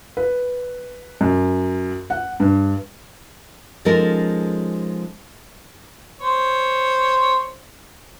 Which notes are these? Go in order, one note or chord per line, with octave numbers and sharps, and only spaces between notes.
B4
F#2
F#5
G2
F3 G#3 C#4 D#4 A4 A#4
C5 C#5